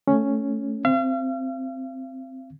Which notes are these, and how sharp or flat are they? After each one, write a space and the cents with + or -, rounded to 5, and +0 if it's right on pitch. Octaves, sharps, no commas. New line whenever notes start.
A3 +0 C#4 +0
C4 +0 F5 -40